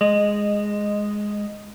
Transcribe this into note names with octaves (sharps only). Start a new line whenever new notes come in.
G#3 D#5